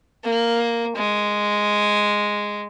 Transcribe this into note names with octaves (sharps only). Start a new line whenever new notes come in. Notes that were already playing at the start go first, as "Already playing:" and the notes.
A#3
G#3